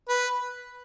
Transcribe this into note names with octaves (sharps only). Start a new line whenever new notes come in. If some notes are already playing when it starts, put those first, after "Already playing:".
B4